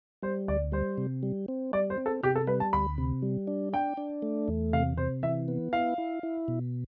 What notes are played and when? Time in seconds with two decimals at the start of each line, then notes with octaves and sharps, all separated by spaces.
0.22 G3 C5
0.48 D2 D5
0.72 G3 C5
0.98 C3
1.23 G3
1.48 C4
1.73 G3 D5
1.90 C5
1.98 C4
2.06 A4
2.23 C3 G4
2.35 A4
2.47 G3 B4
2.60 A5
2.73 D2 B5
2.98 C3
3.22 G3
3.47 D4
3.73 D4 G5
3.97 D4
4.22 A3
4.48 E2
4.73 C3 F5
4.97 C3 C5
5.23 E3 E5
5.48 B3
5.73 E4 F5
5.98 E4
6.23 E4
6.48 B2